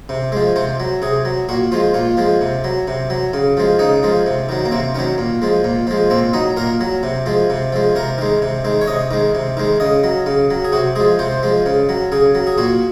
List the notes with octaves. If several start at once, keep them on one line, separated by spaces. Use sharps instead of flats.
C3
F3 G#3
C3 C5
F#3
C3 G#4
F#3
A#2 F#4
F3 G#3 F4
A#2 F4
F3 G#3
C3
F#3
C3
F#3
C#3
F3 G#3
C#3 D#4
F3 G#3
C3
D#3 F#3
A#3
C3 C4
D#3 F#3 C#4
A#2
F3 G#3
A#2
F3 G#3
A#2 C4
F#3 D#4
A#2 A#4
F#3
C3
F3 G#3
C3
F3 G#3
C3 A#4
D#3 G#3
C3
D#3 G#3
C#5
C3 D#5
D#3 G#3
C3
D#3 G#3
C#3 D#5
F#3
C#3
F#3
G#4
C3 F#4
F3 G#3 G#4
C3 C5
F3 G#3
C#3
F#3
C#3 G#4
F#3
G#4
A#2 F#4